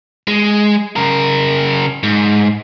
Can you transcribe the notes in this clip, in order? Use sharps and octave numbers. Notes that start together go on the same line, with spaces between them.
G#3
C#3 A#4
G#2